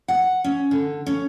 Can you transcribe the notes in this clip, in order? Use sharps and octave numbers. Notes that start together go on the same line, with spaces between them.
F#5
C#4
D3
C#4